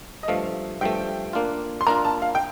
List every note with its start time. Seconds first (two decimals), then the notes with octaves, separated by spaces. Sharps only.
0.23 D#5
0.28 G2 F3 A3 F5
0.81 G2 F3 A3 G5
1.33 A#3 D4 F4
1.81 C6
1.87 A#3 D4 F4 A#5
2.05 A5
2.22 F5
2.35 G5